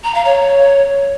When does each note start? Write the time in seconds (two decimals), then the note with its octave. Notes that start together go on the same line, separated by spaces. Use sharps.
0.04 A#5
0.15 F5
0.25 C#5